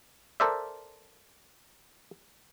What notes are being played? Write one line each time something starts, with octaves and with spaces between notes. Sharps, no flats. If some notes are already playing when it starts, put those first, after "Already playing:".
A4 A#4 C5 D5 E5